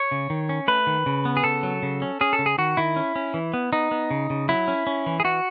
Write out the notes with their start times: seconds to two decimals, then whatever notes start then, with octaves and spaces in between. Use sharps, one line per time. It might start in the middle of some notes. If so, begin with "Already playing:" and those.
Already playing: C#5
0.11 C#3
0.30 D#3
0.49 C#4
0.68 A3 B4
0.87 D#3
1.06 C#3
1.25 B3
1.37 G#4
1.44 C#3 A4
1.63 F#3
1.83 C#3
2.02 C#4
2.21 C#4 G#4
2.33 A4
2.39 C#3
2.46 G#4
2.58 D#3 F#4
2.77 D#3 E4
2.96 C#4
3.16 C#4
3.34 E3
3.54 B3
3.73 B3 D#4
3.91 B3
4.11 C#3
4.30 C#3
4.49 F#3 E4
4.68 C#4
4.87 C#4
5.06 E3
5.20 G#4
5.24 E3 F#4